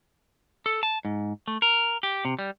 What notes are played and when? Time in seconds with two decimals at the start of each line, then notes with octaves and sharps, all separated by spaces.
0.66 A4
0.83 A5
1.05 G#2
1.48 A3
1.62 A#4
2.03 G4
2.25 C3
2.39 G3